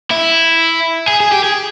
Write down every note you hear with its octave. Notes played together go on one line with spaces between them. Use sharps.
E4
G#4
G#4
G4
G#4